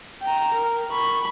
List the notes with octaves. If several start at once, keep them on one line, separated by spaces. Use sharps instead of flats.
G5 A#5
A#4
B5 C#6